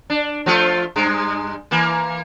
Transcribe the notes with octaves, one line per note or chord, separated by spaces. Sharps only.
D4
F3 A3 F4
G2 G#3
E3 A#3